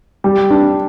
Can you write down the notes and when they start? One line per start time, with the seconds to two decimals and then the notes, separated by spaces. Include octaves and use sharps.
0.24 G3
0.50 D4